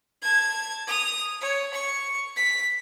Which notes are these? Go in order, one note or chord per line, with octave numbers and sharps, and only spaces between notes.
A5 G#6
D#6 F7
C#5
C#6
B6